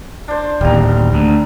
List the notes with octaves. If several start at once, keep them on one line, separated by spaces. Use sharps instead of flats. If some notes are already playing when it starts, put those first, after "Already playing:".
D4 C5
D1 D#2 G3 A#5
D2